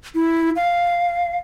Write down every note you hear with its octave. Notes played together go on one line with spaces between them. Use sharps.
E4
F5